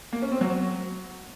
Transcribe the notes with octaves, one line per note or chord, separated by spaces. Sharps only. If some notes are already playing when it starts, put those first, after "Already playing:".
A#3
C#4
C4
F#3